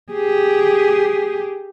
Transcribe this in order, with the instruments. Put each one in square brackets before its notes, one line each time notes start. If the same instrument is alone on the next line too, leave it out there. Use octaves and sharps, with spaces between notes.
[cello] G4 G#4